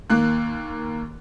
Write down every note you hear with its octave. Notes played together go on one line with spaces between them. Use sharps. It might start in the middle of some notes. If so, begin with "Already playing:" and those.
D#2 A#3 F#6